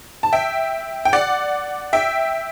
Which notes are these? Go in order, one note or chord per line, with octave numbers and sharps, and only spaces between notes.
A5
E5 G5
G5
D5 F#5
E5 G5